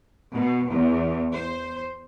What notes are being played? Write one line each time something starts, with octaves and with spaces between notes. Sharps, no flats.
B2
E2
C5